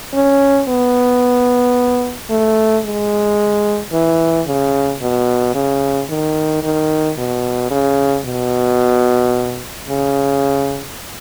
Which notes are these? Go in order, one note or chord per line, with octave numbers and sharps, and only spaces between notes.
C#4
B3
A3
G#3
E3
C#3
B2
C#3
D#3
D#3
B2
C#3
B2
C#3